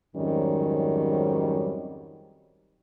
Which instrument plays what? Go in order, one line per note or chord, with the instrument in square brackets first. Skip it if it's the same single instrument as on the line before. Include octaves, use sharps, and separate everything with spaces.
[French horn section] F2 G#2 D#3 F#3 G3 C#4